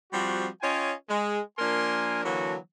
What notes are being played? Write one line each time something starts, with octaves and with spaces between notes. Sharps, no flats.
F3 G3 C4 F#4
C#4 F4 C#5 D#5 G5 G#5
G#3
F3 A#3 D4 A#4 G#5 C6
D3 E3 F#3 A#3 F#4 A4